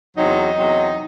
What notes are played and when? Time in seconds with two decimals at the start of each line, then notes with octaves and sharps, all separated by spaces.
0.16 E2 C3 F#3 D#4 D#5
0.57 E2 C3 F#3